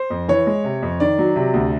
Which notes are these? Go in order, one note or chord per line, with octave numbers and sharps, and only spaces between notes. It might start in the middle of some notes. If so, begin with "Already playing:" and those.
Already playing: C5
F2
E3 C#5
G#3
C3
F2
D#3 D5
F#3
C3
D2